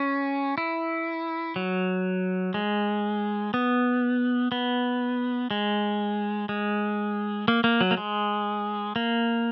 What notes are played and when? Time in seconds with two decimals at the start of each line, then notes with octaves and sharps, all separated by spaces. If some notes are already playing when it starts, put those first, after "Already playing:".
Already playing: C#4
0.58 E4
1.56 F#3
2.54 G#3
3.54 B3
4.52 B3
5.51 G#3
6.49 G#3
7.48 A#3
7.64 A#3
7.81 F#3
7.91 A#3
7.97 G#3
8.96 A#3